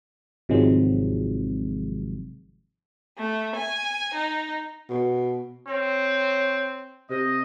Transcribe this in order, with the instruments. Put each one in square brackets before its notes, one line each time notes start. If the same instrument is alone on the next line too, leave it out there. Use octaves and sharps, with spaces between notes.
[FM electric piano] G#1 C3 D#3 F3 F#3 G#3
[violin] A3
G#5
D#4
[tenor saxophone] B2
[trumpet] C4 [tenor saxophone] C#5
[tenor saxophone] C3 [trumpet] D#5